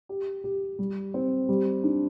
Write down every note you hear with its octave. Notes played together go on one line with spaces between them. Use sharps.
G4
G4
G3
C4
G3
D4